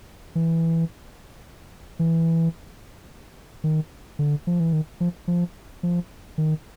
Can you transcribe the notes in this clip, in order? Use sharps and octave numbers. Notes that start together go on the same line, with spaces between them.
E3
E3
D#3
D3
F3
E3
D#3
F3
F3
F3
D#3